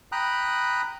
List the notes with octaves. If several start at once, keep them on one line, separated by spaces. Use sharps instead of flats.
G5 A#5 B5 D#6 F#6